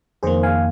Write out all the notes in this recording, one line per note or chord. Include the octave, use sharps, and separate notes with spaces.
F2 D#3 A#3 G#4 C5
F5 G#5